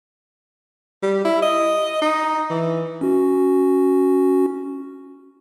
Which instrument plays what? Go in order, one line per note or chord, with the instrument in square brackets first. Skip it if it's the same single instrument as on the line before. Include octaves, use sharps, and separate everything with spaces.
[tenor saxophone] G3
E4
D#5
D#4
E3
[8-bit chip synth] C#4 F#4